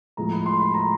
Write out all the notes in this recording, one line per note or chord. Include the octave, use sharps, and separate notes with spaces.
A2 F3 G#3 A#5
B5
C6
B5
A#5